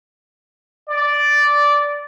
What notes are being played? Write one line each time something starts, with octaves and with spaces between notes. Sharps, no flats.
D5